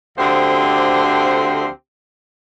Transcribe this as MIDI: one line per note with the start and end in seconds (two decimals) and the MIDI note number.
0.18 1.67 38
0.18 1.67 50
0.18 1.67 53
0.18 1.67 60
0.18 1.67 67
0.18 1.67 72